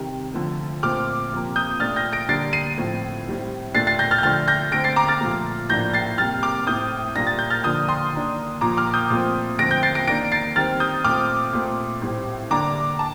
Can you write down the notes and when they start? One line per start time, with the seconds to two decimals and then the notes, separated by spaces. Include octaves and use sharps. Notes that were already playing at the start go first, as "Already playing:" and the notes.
Already playing: C3 D#3 G3
0.34 D3 F3 A3
0.83 A#2 A3 C4 D6 F6
1.32 C3 F3 A#3
1.56 D#6 G6
1.80 A#2 A3 D4 F6 A6
1.96 G6 A#6
2.13 A#6 D7
2.29 D3 G3 A#3 D4 A6 C7
2.53 C7 D#7
2.78 A2 F3 A3 C4
3.26 A2 G3 C4
3.74 A#2 A3 D4 A6 C7
3.87 A6 C7
3.99 G6 A#6
4.11 F6 A6
4.18 G6
4.23 D3 F3 A3 D4 F6 A6
4.48 G6 A#6
4.72 D3 A3 C4 A#6 D7
4.84 A6 C7
4.96 A#5 D6
5.08 F6 A6
5.21 A#2 F3 A3
5.69 A2 F3 A#3 D4 G6 A#6
5.93 A6 C7
6.18 C3 G3 A#3 F6 A6
6.43 D6 F6
6.67 A2 A3 C4 D#6 G6
7.16 A#2 G3 A#3 D4 A#6
7.27 A6
7.39 G6
7.50 F6 A6
7.64 D3 F3 A#3 D4 D#6 G6
7.88 C6 D#6
8.12 D#3 A#3 D4
8.61 A#2 F3 A#3 A#5 D6
8.77 D6 F6
8.94 D#6 G6
9.10 A#2 F3 A3 C4
9.58 D3 F3 A3 C4 A#6 D7
9.71 G6 A#6
9.83 A6 C7
9.95 A#6 D7
10.07 D#3 A#3 D4 A#6 D7
10.32 A6 C7
10.56 D#3 G3 C4 F6 A6
10.80 D#6 G6
11.05 A#2 A3 C4 D6 F6
11.53 A#2 A3 C4
12.02 A2 G3 C4
12.50 D3 G3 A#3 D4 A#5 D6
12.99 A5